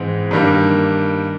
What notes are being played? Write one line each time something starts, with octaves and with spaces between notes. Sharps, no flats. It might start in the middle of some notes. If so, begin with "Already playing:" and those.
Already playing: G#2 E3 G#3 C4
G2 D#3 G3 A#3